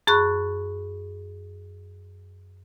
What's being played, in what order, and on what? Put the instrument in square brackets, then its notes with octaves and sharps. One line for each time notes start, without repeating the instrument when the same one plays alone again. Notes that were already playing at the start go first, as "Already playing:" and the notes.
[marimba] F#2 G#4 B5 C#6 F#6